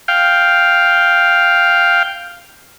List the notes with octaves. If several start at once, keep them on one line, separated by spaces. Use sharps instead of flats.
F5 G5